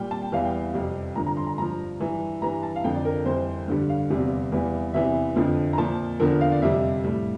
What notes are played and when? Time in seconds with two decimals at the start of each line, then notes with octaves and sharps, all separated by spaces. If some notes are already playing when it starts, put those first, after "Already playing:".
Already playing: A#2 G3 G5
0.11 A5
0.22 G5
0.32 E2 E3 G3 F5
0.45 G5
0.74 F2 C3 G3
1.16 G2 D3 F3 A#5
1.27 A#5
1.37 C6
1.47 A#5
1.58 G2 F3 A#5
2.00 G2 E3 G3
2.42 G2 E3 G3 A#5
2.63 A5
2.76 F5
2.84 F2 D3 F3 G5
2.94 D5
3.05 A#4
3.25 F2 E3 G3 C5
3.68 G2 D3 G3
3.89 F5
4.10 E2 C3 G3
4.52 E2 E3 G3
4.94 E2 C3 E3 E5
5.36 F2 D3 F3
5.73 A#5
5.78 A#2 F3 A5
6.20 E2 D3 F3 A#4
6.41 F5
6.52 D5
6.62 F2 C3 G3 E5
7.04 A2 G3